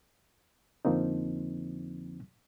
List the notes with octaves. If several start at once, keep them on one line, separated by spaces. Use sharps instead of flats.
F2 D3 F3 A#3 C4 D#4